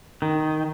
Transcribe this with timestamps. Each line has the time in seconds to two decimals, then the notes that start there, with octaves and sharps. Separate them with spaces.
0.22 D#3